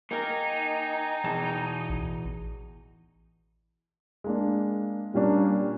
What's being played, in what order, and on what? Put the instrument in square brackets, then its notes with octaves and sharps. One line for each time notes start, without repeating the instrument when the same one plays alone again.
[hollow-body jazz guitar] A#3 A#4 [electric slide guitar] D#4 [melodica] G5 G#5 A#5
[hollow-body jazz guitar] E2 B2 A5
[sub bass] A1
[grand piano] G#3 A#3 D4
[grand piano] A#2 C#4 D4 [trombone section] G3 A#3